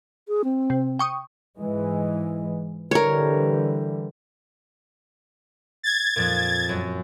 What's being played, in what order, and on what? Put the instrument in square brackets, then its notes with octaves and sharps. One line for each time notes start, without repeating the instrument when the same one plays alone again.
[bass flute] G#4
C4
[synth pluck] C3
G5 C#6 D#6
[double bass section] G#2 E3 G#3
[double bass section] D3 E3 G3 [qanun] A#4 C#5
[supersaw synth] G#6 A6
[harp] F2 A#2
F#2